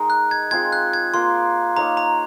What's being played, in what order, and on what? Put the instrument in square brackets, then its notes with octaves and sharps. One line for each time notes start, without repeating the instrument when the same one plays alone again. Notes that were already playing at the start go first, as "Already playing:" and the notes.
Already playing: [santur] G#3 D#4 A#4 D#5
[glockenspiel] F#6
G#6
[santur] G#3 C4 F4 G#4 [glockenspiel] G#6
[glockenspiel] F#6
G#6
[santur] A#3 F4 A#4 [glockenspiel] C6
[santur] A#3 D#4 A#4 C#5 [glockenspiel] A#5
[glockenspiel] A#5